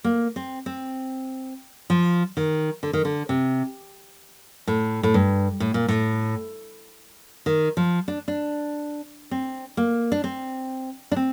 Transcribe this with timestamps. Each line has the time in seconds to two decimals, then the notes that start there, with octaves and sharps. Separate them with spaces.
0.04 A#3
0.36 C4
0.66 C4
1.90 F3
2.37 D#3
2.83 D3
2.93 D#3
3.05 D3
3.29 C3
4.68 A2
5.03 A2
5.14 G2
5.60 A2
5.74 A#2
5.88 A2
7.46 D#3
7.77 F3
8.08 D4
8.28 D4
9.31 C4
9.77 A#3
10.12 D4
10.24 C4
11.12 D4
11.16 C4